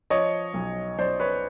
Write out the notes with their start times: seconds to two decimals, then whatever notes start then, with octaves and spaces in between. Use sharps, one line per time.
0.10 F3 C#5 D#5
0.54 B1
0.98 B1 C5 D5
1.20 B4 C#5